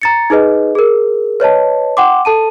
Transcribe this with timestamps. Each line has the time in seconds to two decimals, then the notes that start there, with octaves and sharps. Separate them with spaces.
0.02 A#5 A6 C#7
0.30 D#4 G#4 B4 D#5
0.75 G#4 A#4
1.40 B4 C#5 D#5 A5
1.97 F#5 G5 C6 D6
2.25 A4 A5 D#7